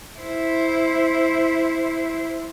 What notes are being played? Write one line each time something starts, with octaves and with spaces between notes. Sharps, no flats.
E4 C5